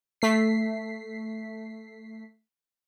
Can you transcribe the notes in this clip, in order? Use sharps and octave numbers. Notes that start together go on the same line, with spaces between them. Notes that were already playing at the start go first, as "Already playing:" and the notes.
A3 B6 C7